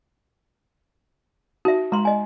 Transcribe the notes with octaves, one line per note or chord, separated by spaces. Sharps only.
D#4 F#4 E5
G#3 A#5 C6
D#5 G#5